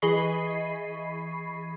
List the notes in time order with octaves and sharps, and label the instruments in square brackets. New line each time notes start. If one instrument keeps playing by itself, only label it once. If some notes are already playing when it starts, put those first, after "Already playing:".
[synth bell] E3 G#4 D#5 B5 C#6 C7